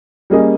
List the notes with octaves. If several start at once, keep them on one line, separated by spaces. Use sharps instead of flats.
G3 A#3 C#4 G#4 D#5